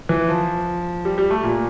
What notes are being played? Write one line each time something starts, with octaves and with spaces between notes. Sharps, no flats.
E3
F3
G3
G3
A3
A#2